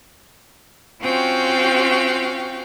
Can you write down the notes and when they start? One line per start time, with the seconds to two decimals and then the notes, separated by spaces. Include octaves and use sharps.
1.02 C4 C#4 F4 F#4 F5 G5